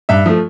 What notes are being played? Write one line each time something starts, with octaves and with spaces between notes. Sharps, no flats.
G2 E5
F3 A3